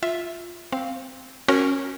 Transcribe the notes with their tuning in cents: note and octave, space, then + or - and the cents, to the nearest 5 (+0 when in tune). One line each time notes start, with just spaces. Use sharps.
F4 +0 E5 +0
C4 +0 F5 +0
C#4 -15 F#4 +0 A#4 +0